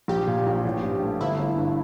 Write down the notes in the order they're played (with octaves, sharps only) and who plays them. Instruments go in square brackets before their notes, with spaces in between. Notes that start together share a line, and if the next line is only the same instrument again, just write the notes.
[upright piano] A#1 [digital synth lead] G4
[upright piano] A#2
A#1
A1
G2
A3
[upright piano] G1 [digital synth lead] E4
[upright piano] G1
G2